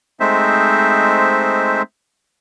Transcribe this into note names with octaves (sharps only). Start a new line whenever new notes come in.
G#3 A3 C4 D#4 C5 E5